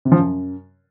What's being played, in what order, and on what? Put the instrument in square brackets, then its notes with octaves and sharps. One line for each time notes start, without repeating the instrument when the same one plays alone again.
[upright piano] C3
F3
F#2